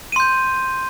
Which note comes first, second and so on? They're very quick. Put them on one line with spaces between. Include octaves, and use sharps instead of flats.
D#7 C6 G6